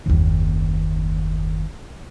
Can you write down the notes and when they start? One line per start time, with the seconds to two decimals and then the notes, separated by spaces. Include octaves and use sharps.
0.06 F#1 D#2